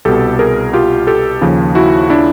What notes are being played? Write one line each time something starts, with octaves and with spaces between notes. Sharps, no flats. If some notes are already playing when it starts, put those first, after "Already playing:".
C2 B2 G4 A4
G#4 A#4
F4 G4
G4 A4
D#2 C#3 F3
E4 F#4
D4 E4